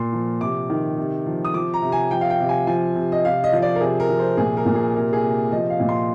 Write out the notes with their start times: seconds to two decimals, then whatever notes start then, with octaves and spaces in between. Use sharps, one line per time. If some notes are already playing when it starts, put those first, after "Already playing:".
Already playing: A#2 C6
0.13 F3
0.41 C3 D6
0.70 D#3
0.97 C3
1.26 F3
1.45 D#6
1.53 F3 D6
1.74 A#5
1.82 C3
1.92 G#5
2.11 F3 G5
2.21 F5
2.30 G5
2.40 C3
2.49 G#5
2.67 F3 G#5
2.95 C3
3.12 D#5
3.24 C3 F5
3.44 D#5
3.52 F3
3.58 D#5
3.62 D5
3.75 A#4
3.81 C3 G#4
4.00 A#4
4.09 F3
4.19 C5
4.37 A#2 G#4
4.57 A#4
4.66 A#2
4.75 G#4
4.95 C3 A#4
5.13 G#4
5.23 C3
5.51 F3 D#5
5.70 F5
5.80 A#2
5.89 C6